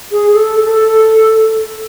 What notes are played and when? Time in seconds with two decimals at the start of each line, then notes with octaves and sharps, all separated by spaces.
0.12 G#4
0.33 A4
0.65 A4